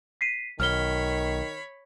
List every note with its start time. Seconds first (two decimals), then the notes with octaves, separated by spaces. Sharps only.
0.21 B6 C7 D#7
0.60 B1 D#3 C#5 B5 F6 G7